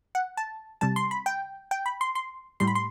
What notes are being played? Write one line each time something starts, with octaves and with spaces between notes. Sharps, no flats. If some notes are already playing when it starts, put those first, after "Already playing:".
F#5
A5
C3 G3 A5
C6
B5
G5
G5
B5
C6
C6
A2 G3 C6
B5
C6